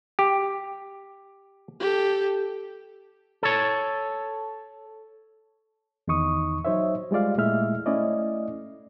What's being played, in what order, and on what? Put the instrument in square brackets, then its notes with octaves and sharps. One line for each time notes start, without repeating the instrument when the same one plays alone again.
[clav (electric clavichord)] G4
[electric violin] G4 A4
[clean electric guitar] A4 C#5
[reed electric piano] E2 D#3 D#4 C#6 D#6
F#3 D#4 C5 C#5 E5
G3 G#3 F4 D5 F5
A#2 G#3 A3 E4 E5 F6
A3 C#4 E4 D5 D#5